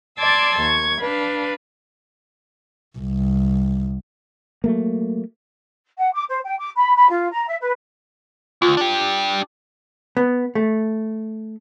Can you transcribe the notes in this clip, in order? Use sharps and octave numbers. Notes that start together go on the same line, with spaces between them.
D5 A5 C6 D6 E6 G#6
D#2 C#6 G#6
D4 B4 F5
C2
F#3 A3 A#3
F#5
D6
C5
G5
D6
B5
B5
F4
A#5
E5
B4
D2 F4
D4 G4
B3
A3